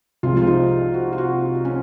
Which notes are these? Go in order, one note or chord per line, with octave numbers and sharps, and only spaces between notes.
C2 C3 F3 G#3 F4
F4
D#4
F#4
F4
F#4
C#4